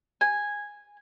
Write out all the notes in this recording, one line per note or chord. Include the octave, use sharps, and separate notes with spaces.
G#5